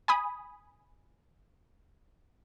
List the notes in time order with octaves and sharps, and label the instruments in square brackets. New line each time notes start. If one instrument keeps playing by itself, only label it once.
[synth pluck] G#5 B5 D#6